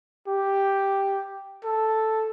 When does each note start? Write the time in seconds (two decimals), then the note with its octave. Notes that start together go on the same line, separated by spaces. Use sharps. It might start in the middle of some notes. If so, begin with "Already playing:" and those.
0.28 G4
1.64 A4